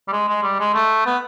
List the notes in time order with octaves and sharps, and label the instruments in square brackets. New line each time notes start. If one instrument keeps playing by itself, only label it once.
[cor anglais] G3
G#3
G#3
G3
G#3
A3
B3